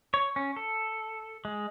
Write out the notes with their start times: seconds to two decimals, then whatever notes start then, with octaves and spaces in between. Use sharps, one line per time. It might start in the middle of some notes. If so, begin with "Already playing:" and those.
0.14 C#5
0.36 C#4
0.56 A4
1.45 G#3